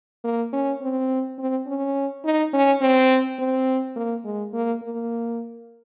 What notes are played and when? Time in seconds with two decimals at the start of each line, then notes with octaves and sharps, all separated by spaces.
0.24 A#3
0.53 C#4
0.82 C4
1.39 C4
1.67 C#4
2.25 D#4
2.53 C#4
2.81 C4
3.39 C4
3.96 A#3
4.24 G#3
4.53 A#3
4.82 A#3